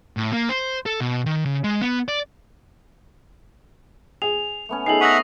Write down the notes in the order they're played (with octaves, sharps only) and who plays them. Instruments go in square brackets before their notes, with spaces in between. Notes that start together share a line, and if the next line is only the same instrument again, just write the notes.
[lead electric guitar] A2
A#3
C5
A4
B2
D#3
C#3
G#3
B3
D5
[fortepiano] G#4 [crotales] F7
[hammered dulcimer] A3 B3 C#4
[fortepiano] D#4 G#4 A4 [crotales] C7 F#7
[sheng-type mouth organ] E5 F#5 [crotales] C#6 D#6 A#6